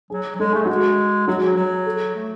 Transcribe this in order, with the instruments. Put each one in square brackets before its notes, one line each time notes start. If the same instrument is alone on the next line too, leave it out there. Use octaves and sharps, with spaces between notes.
[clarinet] F#3 [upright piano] G#4
[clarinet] F#3
[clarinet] G#3 [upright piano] A4
[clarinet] A3 [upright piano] G#4
[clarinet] F#3
[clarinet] G#3 [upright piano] F#4
[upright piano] G#4
[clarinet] F#3 [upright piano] F#4
[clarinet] F#3 [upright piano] G#4
[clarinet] F#3
[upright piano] A4
[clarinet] A3